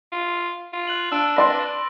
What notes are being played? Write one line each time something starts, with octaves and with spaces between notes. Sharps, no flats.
F4
F4
F#6 F#7
D4 E6 D7
B4 D5 C6 A#6